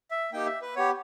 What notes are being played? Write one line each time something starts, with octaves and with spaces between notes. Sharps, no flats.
E5
A#3 D#4 G4 G5
E5
B4
B3 G4 C#5